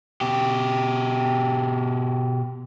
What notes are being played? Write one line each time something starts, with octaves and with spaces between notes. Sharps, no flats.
B2 G4